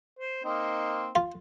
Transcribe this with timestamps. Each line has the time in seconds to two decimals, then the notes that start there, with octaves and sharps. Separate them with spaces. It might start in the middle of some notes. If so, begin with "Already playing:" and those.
0.19 C5
0.44 A#3 C4 D#4
1.16 F4